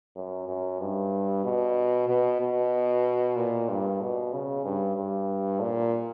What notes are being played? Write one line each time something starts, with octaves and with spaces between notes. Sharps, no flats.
F#2
F#2
G2
B2
B2
B2
A#2
G2
B2
C#3
G2
G2
A#2